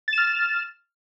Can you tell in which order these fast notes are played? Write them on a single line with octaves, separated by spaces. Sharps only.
A6 E7 F6